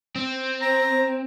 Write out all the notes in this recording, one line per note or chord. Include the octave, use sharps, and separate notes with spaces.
C4
C5 A#5